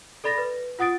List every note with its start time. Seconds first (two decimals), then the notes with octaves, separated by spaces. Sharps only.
0.24 A4 D5 B5 A6 A#6
0.38 B4
0.79 F4 F#5 D#6 A6 D7